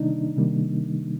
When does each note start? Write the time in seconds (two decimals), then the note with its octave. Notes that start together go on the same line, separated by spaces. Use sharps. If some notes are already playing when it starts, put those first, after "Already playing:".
Already playing: C3 D#3 G3 A#3 D4 D#4
0.37 C3 D#3 G3 A#3